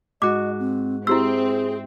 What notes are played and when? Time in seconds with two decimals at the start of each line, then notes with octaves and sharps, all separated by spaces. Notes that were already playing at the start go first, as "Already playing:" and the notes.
0.22 G#2 F#4 D#5 D6
0.59 C4
1.07 C4 E4 G4 G#4 E5 C6 E6